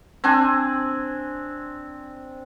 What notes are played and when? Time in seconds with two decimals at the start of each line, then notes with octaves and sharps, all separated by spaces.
0.24 C4 D4 G#5